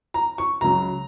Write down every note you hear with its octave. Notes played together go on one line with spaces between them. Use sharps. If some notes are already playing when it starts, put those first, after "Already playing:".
A#5
C#6
C#2 C#3 F#3 A#5